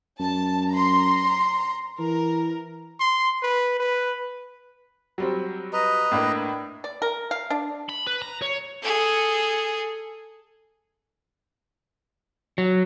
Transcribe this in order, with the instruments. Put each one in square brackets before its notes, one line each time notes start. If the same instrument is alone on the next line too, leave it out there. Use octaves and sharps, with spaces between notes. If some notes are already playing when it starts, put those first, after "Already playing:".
[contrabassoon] F#2 [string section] A5
[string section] A#5 C6
[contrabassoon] E3 [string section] A#4
[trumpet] C6
B4
B4
[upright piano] F#3 G3 C4
[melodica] B4 D#5 A#5
[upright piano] A2 A#3 D4
[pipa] D5
A#4
F5
D4
[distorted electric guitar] B5
B4
A#5
C#5
[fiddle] G#4 A4
[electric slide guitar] F#3